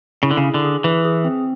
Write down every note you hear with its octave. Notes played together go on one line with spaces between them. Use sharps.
C#3 E4
D3
C#3
G#4
D3
G#4
E3 B4
G#4
C4